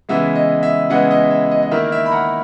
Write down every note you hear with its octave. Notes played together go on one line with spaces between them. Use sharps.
C#3 E3 G#3 B3 E5
D#5
E5
C#3 E3 G#3 B3 D#5 F#5
D#5
E5
D#5
D#5
D#3 A#3 E4 E5
E5
B5
F#5 A#5